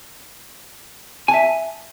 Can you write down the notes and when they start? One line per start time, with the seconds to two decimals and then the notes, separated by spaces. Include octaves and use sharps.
1.28 G#5
1.31 A5
1.34 E5